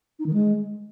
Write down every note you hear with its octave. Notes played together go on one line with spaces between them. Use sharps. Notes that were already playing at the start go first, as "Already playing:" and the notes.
D#4
D#3
G#3